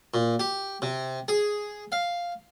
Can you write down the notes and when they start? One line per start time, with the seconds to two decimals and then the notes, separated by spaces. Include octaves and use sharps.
0.14 A#2
0.40 G4
0.82 C3
1.28 G#4
1.92 F5